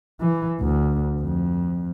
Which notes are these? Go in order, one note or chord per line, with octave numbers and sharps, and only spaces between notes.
E3
D2
F2